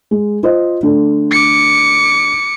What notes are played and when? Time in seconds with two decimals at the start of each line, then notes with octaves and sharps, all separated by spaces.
0.11 G#3
0.43 F4 C5 D#5
0.83 D3 A3
1.31 D6 C#7